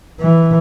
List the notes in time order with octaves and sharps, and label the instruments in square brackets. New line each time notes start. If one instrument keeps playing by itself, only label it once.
[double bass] E3